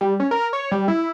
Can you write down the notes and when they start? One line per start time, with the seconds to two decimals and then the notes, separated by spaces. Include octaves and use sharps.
0.01 G3
0.20 C#4
0.31 A#4
0.53 C#5
0.71 G3
0.88 E4